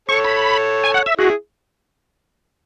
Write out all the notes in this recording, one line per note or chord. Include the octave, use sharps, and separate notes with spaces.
A4 C#5 C#6
B5
G#5
F#5
E5
E4 F#4 G#4